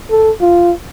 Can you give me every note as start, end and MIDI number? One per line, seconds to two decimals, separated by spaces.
0.10 0.31 69
0.41 0.72 65